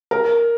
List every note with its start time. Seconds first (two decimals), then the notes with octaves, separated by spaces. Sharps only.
0.11 A#4